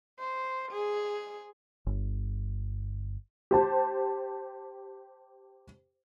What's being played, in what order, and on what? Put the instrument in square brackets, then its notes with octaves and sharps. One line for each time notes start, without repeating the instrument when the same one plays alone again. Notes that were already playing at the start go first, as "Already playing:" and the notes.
[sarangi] C5
G#4
[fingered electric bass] G1
[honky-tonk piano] G4 C5 A5